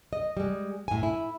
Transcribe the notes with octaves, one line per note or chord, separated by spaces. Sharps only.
D#5
G3 G#3
A2 G#5
E4